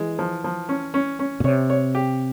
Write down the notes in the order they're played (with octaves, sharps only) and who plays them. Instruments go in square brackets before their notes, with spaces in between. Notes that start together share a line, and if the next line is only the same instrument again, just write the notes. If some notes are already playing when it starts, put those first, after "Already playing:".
Already playing: [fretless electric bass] E3 [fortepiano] G#3
[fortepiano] F3
F3
C#4
C#4
C#4
[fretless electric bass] A#2
[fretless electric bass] C3 [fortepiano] C#5
[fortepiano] C#5
G4